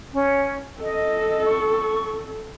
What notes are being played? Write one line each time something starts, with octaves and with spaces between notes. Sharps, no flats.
C#4
A4 D#5
C#6